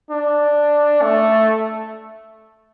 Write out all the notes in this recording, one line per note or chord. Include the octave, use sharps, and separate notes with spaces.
D4
A3